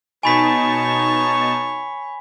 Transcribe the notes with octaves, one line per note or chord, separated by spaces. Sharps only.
B2 D#4 C#5 G#5 A5 B5 C#6 B6